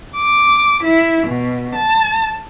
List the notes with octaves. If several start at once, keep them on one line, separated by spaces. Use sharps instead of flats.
D6
E4
B2
A5